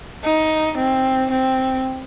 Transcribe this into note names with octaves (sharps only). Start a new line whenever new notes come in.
D#4
C4
C4